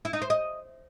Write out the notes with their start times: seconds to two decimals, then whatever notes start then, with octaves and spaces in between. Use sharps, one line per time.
0.05 E4
0.13 D#4
0.22 C5
0.30 D#5